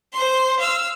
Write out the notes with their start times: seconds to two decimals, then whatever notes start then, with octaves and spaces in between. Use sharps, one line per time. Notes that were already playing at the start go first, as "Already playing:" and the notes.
0.13 C5 C6
0.60 F5 E6